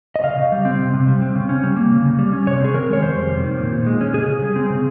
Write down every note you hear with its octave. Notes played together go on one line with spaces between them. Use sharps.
D#5
C#3 F5
C#3
G3
C4
C3
C3
G3
C4
C#3
C#4
G3
A#3
C#3
C#3
G3
C#4
C3 C#5
C4 G#4
D#3 A#4
G#3 C#5
F2 C5
G3
C3
D#3
A#2
A#2
G#3
C#4
C#3 G#4
C#3
G3
C4
C#3